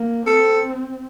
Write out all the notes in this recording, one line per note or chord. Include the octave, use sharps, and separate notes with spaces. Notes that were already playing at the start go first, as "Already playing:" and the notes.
Already playing: A#3
C4 A4